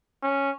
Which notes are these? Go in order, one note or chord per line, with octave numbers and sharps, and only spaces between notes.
C#4